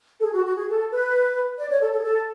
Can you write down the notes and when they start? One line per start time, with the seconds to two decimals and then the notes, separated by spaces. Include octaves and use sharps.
0.19 A4
0.22 G#4
0.34 F#4
0.44 F#4
0.56 G#4
0.68 A4
0.91 B4
1.58 D5
1.69 C#5
1.80 A4
1.92 A4
1.99 G#4
2.03 A4